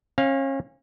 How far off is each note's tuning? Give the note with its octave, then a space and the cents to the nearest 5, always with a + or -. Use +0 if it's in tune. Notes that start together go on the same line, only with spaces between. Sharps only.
C#4 -35 F5 +0